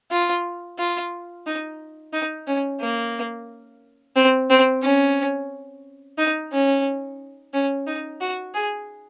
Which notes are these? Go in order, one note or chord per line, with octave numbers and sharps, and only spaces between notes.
F4
F4
D#4
D#4
C#4
A#3
C4
C4
C#4
D#4
C#4
C#4
D#4
F#4
G#4